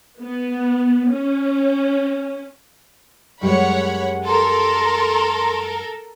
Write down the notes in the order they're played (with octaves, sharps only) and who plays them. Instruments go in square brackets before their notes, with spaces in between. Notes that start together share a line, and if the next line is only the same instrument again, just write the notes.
[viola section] B3
C#4
[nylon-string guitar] F#2 G3 G#3 [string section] C#5 F#5 B5
[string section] A4 A#4 [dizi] C6